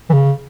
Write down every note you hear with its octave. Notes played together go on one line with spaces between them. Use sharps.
E3
C#3